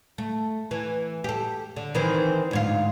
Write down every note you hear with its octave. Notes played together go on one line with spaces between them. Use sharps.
A3
E3
G4 A4
D3
D#3 E3 C4
D2 G#2 F4